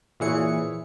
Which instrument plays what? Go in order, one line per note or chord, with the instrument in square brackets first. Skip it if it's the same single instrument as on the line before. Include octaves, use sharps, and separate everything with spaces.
[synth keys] A#2 E3 C#7 [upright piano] E4 G#4 C#5